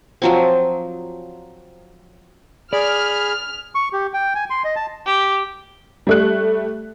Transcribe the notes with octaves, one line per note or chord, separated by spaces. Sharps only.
F3 F#3 C4
G#4 D5 B5 F6
C#6
G4
G5
G#5
C6
D#5
A5
G4
G3 A3 F#6